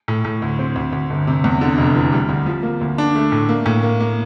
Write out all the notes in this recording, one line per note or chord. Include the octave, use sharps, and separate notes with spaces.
A2
A2
D2
C4
D2
D2
G1
C3
E2
D3
F1
E3
G3
D2
F3
A#3
D2
D4
A3
A2
A#3
A2
A#3
A#3